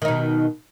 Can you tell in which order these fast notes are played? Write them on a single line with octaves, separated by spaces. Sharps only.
D#3 D#4 B2